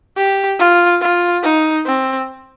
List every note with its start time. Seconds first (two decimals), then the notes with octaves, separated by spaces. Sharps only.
0.17 G4
0.59 F4
1.01 F4
1.43 D#4
1.86 C4